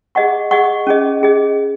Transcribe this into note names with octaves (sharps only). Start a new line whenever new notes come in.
G#4 D#5 F#5 C#6
G#4 D#5 F#5 C#6
C#4 G#4 D#5
C#4 G#4 D#5